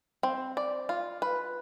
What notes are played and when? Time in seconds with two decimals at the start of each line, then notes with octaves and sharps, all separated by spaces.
0.23 C4
0.57 D5
0.89 F4
1.22 B4